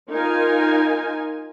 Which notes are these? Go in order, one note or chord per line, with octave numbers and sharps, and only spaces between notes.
D#4 F4 A#4 G#5